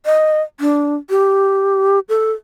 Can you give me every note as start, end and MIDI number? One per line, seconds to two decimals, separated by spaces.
0.06 0.42 75
0.60 0.95 62
1.10 1.99 67
2.09 2.31 69